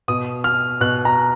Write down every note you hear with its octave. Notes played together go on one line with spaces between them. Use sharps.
B2 D#6
F6
B2 F#6
A#5